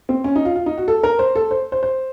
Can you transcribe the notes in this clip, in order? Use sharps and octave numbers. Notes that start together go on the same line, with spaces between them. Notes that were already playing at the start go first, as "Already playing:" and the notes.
C4
C#4
D#4
F4
F4
D#4
F#4
A4
A#4
C5
A4
C5
C5
C5